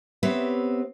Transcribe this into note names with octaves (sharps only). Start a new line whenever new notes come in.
B3 C4 G4 B4 C#5 E5